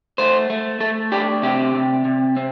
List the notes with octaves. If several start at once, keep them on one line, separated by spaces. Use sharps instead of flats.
A3 C5
A3
A3 A4
D4 G4
C3 G4
C3
C3
C4